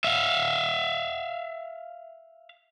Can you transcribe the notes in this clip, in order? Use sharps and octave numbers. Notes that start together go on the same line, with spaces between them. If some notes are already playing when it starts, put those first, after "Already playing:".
E5 F5